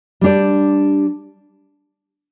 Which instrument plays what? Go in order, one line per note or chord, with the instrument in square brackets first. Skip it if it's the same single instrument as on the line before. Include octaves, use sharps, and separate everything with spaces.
[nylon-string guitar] G3 D4 G4 D5